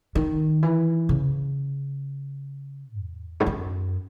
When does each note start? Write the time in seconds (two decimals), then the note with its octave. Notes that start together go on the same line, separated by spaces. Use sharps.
0.15 D#3
0.63 E3
1.09 C#3
2.99 E2
3.40 G#2
3.46 F#2